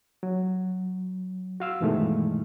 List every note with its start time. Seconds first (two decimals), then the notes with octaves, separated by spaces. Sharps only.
0.23 F#3
1.60 F#4 F5 E6
1.81 G2 B2 D#3 E3 G#3 A3